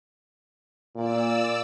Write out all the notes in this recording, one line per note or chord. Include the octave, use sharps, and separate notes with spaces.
A#2 D5 E6